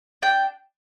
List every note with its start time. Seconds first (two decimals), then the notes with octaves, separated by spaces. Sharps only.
0.22 D4 G5